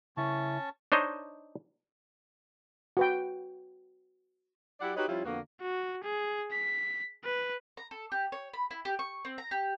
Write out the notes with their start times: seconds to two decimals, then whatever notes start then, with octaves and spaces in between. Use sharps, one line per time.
0.17 C#3 C#4 E4 A5 C#6
0.92 D4 D#4 C5 C#5 D#5
2.97 F#4 B4 G5
4.81 F#3 E4 G4 D5 F#5
4.96 D#4 F#4 G4 B4 C#5 D#5
5.08 F3 G3 C#4 E4 F4
5.25 F2 D3 A#3 B3 F#4
5.61 F#4
6.03 G#4
6.51 B6
7.25 B4
7.77 A#5
7.91 A4
8.12 G4
8.32 C#5
8.53 B5
8.71 E4
8.85 G4
8.99 C#6
9.25 C4
9.38 A#5
9.51 G4